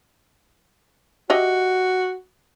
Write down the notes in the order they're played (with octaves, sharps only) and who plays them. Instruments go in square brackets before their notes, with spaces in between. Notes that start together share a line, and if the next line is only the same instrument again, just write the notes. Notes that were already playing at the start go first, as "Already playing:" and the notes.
[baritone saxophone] F#4 [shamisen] G4 D#5 E5